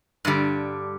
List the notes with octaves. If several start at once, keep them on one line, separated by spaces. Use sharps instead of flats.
G2 D3 G3